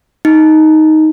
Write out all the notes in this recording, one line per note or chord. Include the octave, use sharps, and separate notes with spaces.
D#4